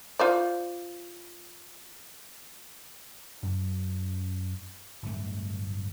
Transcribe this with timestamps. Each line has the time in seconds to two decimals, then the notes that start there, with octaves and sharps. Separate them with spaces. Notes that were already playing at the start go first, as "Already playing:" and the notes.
0.19 F4 C5 D5
3.43 F#2
5.02 D1 G1 A3